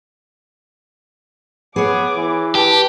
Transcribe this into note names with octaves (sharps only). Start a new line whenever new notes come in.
B3 G#4 C#5 D6
E3
G4 B4 A5